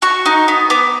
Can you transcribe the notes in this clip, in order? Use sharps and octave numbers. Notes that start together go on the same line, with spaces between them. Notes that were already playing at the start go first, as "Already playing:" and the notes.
F#4 C#6
D#4
B3
B3 D6